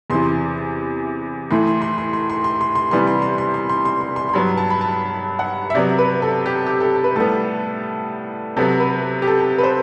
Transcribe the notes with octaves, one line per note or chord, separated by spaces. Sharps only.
E2 C3 E3 C6
A2 E3 A3 C6
C6
C6
C6
C6
C6
C6
C6
C6
C3 E3 G3 B3 C6
C6
C6
C6
C6
C6
C6
C6
C6
C6
G2 F#3 B3 B5
A5
B5
A5
F#5
E5
C3 F#3 B3 D5
B4
A4
G4
G4
A4
B4
A2 G3 B3 A4
C3 F#3 B3 A4
B4
G4
A4
B4
C5